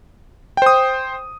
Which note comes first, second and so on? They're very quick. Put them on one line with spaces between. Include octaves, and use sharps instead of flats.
G5 C5 D#6